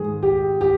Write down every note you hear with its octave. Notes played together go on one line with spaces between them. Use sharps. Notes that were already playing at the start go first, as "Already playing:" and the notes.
Already playing: G#2 D#3 G#3 G#4
G4
G4